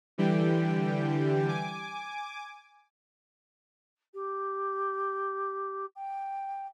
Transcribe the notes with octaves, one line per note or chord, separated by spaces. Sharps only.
D3 E3 G3 G4 G5
G#5 D6
G4
G5